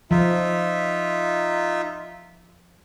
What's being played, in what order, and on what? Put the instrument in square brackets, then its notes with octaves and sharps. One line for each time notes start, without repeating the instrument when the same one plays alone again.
[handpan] F3 [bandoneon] D#4 F4 E5